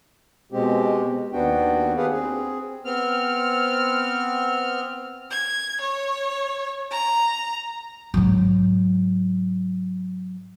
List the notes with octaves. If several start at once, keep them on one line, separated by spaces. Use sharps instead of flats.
B2 G#3 C4 G4
D#2 B3 D4 F#4 G5
G4 G#4 B4 F5 F#5
C4 G#4
B3 C4 F6
G#6
C#5
A#5
G#2 F#3